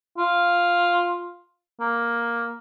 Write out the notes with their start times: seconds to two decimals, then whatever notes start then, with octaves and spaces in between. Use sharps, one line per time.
0.18 F4
1.80 A#3